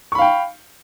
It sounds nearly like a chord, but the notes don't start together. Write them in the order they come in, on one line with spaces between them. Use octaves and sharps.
C#6 B5 F5 G5